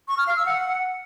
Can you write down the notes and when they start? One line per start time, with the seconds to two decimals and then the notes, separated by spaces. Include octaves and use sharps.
0.08 C#6
0.18 F6
0.27 F5
0.36 E6
0.46 F#5